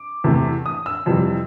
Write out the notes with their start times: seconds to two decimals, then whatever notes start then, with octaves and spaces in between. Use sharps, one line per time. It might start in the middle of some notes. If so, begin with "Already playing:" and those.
Already playing: D6
0.24 E2 C3 E3 A3
0.66 D#6
0.86 E6
1.06 F2 C3 E3 G3